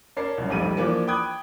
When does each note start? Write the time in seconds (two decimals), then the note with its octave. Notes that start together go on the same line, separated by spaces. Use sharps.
0.17 C#4 A#4 D5 A5 C7
0.38 C2 F#2
0.50 A#1 F2 G#2 G3 A3 D#7
0.77 E3 F3 A#3 D4
1.08 G5 B5 D6 D#6 F#6 G#6